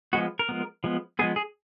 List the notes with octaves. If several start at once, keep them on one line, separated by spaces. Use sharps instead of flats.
F3 G#3 B3 F#4
A#4
F3 G#3 B3
F3 G#3 B3
F3 G#3 B3 G#4
G#4